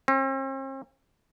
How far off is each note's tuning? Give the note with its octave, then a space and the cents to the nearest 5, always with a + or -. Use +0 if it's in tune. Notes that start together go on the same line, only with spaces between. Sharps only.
C4 +45